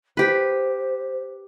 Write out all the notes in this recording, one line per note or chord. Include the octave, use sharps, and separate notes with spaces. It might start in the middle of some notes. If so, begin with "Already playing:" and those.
G4 B4 C5